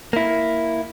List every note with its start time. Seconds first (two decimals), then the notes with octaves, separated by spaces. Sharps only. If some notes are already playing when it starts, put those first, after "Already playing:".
0.13 A#3 E4